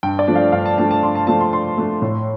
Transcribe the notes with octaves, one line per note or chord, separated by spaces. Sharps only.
G2 G5
D5
F3 A3 D4
F5
G2 F5
A5
F3 A3 D4 A5
A5
G2 C6
A5
F3 A3 D4 A5
C6
G2 C6
F3 A3 D4
A2